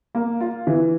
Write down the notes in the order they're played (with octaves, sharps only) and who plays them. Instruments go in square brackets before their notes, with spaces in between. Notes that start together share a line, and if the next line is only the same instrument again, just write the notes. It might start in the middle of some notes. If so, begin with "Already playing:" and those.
[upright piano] A#3
F4
E3